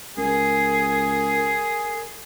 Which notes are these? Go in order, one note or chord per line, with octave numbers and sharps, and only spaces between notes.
C#2 G#4 A#4